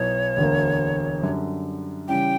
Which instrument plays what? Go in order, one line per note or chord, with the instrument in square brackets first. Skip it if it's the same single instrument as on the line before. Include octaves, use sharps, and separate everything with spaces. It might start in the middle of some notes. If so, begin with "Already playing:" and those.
Already playing: [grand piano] B1 B2 F#3 B3 E4 [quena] C#5
[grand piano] E1 D2 D3 A#3
F#2 D3 G3
[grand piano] C#3 E3 G3 C#4 E4 [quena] G5